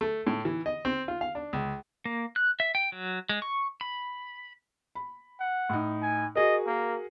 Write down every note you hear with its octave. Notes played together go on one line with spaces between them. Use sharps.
A3
A2
E3
D#5
C4
F4
F5
D4
C#2
A#3
F#6
E5
G5
F#3
G#3
C#6
B5
B5
F#5
A2 D#4
G#5
F#4 G#4 A#4 D#5
A#3